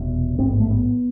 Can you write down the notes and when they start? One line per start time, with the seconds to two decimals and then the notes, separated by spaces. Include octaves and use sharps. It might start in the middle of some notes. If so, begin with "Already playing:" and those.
Already playing: F1 E2 B2
0.38 A1 G#2 C4
0.49 B3
0.60 A3
0.70 B3